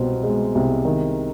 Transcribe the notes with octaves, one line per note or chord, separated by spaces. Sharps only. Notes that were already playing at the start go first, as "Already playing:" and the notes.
Already playing: C2 B2 C4
G#3
C2
D#3